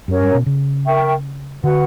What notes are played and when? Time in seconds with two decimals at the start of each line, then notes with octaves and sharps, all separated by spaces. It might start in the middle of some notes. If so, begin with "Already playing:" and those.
0.08 F#2 C#4 G4 A#4 C#5
0.21 G2
0.34 B2
0.46 C#3
0.85 A#4 E5 G5 C#6
1.63 D3 F#4 B4 F#5